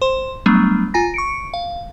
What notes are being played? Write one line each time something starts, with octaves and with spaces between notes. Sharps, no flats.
C5 C6
F#3 G3 A3 B3 D4
F4 G#5 A#5 A#6
C#6 C#7 D7
F5